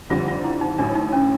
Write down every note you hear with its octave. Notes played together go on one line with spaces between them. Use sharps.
F#1 F2 D3 G3 F4
F4
E4
D#4
A1 A2 F#3 D4
D#4
C#4